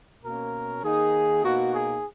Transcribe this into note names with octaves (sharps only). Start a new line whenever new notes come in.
B2 A#3 C#4 A#4
D#3 A#3 D#4 G#4
B2 A#3 D#4 F#4
G#4